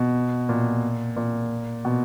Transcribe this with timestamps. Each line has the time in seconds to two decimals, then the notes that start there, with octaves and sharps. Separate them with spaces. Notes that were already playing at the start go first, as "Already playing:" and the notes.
Already playing: B2
0.49 A#2
1.16 A#2
1.85 B2